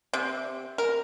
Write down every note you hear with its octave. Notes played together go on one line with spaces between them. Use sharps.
C3
A#4